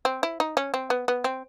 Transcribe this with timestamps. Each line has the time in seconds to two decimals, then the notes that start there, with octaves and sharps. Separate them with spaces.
0.05 C4
0.23 E4
0.40 D#4
0.57 C#4
0.74 C4
0.90 B3
1.08 B3
1.24 C4